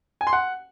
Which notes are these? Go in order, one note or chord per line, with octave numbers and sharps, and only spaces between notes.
G#5
C6
F#5